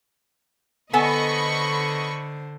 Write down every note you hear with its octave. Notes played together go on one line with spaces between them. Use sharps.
D3 B3 A4 C5 D#5 G#5 B5 C#6